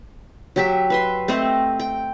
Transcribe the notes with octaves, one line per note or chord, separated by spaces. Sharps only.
F#3 G4 E5
B4 E5 C6
A3 C4 C5 D#5
G5